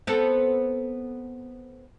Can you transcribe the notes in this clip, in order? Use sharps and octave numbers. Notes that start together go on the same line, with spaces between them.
B3 C4 A4